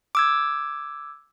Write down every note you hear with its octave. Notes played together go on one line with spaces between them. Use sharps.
D6 E6 G#6